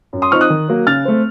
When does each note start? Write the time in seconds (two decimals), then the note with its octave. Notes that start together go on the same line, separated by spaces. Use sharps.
0.13 F#2
0.22 C6 D#6
0.31 F3 C4 D#4 C#6 F6
0.41 D#6 F#6
0.50 D#3
0.68 F#3 A#3
0.87 C#3 F6 A6
1.05 A3 C4